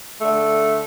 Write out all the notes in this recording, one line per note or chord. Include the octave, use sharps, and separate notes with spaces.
D3 A3